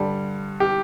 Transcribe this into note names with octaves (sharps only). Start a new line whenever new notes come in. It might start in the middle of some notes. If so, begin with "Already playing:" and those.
Already playing: G2 D3 G3
G4